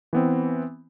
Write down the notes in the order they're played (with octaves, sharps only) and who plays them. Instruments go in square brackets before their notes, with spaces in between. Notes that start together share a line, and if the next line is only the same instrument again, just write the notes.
[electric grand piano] E3 B3 C4